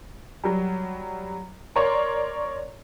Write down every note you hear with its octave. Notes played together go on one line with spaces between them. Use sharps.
F#3 G3
A#4 C#5 D5 C6